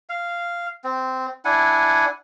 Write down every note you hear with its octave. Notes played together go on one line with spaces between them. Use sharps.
F5
C4
D4 E4 F#5 G#5